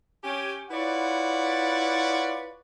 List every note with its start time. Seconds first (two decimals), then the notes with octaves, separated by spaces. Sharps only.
0.24 C#4 G4 G#5
0.70 E4 F4 B4 C#5 D5 F#5